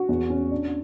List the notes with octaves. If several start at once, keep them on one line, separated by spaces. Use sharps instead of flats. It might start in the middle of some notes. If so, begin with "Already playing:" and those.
Already playing: F#4
E2
C#4
D4